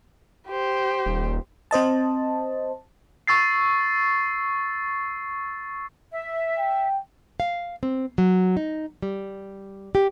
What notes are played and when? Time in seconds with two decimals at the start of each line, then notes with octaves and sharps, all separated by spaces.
0.48 G4 C5
1.06 D#1
1.71 C4 C5 D#5 A5
3.27 C#6 E6 A6 C7
6.11 E5
6.58 G5
7.40 F5
7.83 C4
8.18 F#3
8.57 D#4
9.02 G3
9.95 G4